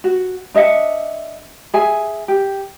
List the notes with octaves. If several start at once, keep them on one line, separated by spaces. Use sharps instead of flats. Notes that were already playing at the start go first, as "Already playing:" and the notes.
F#4
D4 D#5 E5 F#5
G#4 E5 G#5
G4